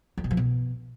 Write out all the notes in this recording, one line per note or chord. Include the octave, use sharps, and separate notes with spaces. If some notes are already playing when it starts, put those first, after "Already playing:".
F2
B2
F3
B2